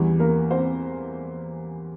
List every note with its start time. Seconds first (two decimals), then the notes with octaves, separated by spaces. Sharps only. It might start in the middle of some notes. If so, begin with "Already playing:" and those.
Already playing: E2 E3 G3
0.19 A#3 A#4
0.51 C4 C5